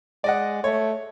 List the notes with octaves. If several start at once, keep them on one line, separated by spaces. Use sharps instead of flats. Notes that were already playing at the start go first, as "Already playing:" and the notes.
G#3 D5 D#5 F#5
A3 C#5